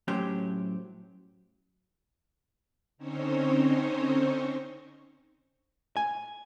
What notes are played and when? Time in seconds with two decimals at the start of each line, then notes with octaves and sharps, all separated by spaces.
0.08 A2 F#3 C#4 G4 C5
2.98 D3 C4 C#4 D#4 C5 C#5
5.97 G#5